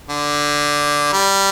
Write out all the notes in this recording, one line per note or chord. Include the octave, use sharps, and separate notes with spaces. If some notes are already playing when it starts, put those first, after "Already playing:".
D3
G3